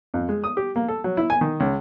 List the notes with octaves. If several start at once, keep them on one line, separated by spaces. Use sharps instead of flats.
F2
G#3
D#6
G4
A#3
A4
F#3
E4
G#5
D#3
C#2